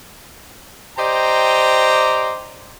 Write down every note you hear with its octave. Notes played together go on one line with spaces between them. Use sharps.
G4 C5 D5 D#5 G5 A#5